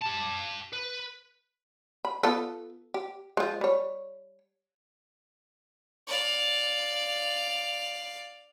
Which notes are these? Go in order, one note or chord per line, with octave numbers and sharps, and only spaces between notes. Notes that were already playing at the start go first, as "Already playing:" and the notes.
G4 A5
B4
B5
B3 F4 A4
G4
F3 G#3
G3 C#5
D5 F5